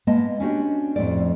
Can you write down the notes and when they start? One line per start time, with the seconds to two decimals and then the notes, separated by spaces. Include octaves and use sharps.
0.07 G#3 A#3 B3 D#5 A5
0.40 C#4 D4 F#4 G4
0.96 F2 A2 D5